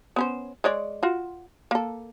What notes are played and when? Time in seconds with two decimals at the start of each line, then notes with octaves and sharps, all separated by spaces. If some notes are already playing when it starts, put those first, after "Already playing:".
0.16 B3 C#4 C5
0.64 G#3 C#5 D5
1.03 F4 F#4
1.71 A#3 A4